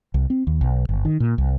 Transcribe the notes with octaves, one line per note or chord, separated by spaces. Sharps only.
C2
C4
D#2
B1
G1
D#3
A#2
C2